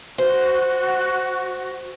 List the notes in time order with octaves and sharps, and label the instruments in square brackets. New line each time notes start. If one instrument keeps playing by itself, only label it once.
[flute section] F#4 [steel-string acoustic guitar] C5